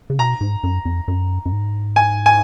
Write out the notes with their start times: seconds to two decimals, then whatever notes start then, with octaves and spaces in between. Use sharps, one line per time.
0.10 C#3
0.19 B2 A#5
0.41 G#2
0.63 F#2
0.85 F2
1.08 F#2
1.45 F#2
1.52 G#2
1.96 G#5
2.26 G#5